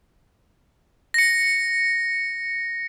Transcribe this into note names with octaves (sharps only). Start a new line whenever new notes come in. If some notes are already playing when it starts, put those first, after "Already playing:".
A#6 C#7